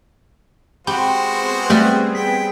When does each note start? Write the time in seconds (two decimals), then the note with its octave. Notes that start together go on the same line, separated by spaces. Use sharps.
0.87 G#3 C4 F#4 G4 C5 B5
1.26 B3 C4 G#4
1.70 G3 A3 B4
2.15 G5 B6